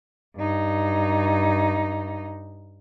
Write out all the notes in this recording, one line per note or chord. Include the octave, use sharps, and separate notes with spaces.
G2 D#4